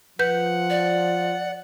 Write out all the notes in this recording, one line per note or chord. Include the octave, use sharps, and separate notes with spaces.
F3 B4 F#5 G6
D5